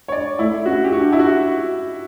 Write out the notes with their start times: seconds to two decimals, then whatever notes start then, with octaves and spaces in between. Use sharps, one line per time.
0.08 C#5
0.12 D5
0.39 A3 E4
0.66 C#4 F#4
0.84 G4
0.92 D4 F#4
1.12 E4
1.19 F#4